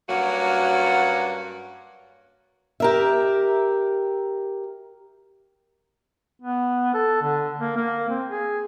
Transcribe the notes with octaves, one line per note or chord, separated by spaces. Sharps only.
G2 F#3 A#3 C#4 F#4 F#5
G4 A#4 E5
B3
A4
D3
A#3
A#3
C4
G#4